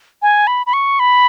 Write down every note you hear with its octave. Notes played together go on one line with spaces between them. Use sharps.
G#5
B5
B5
C#6
B5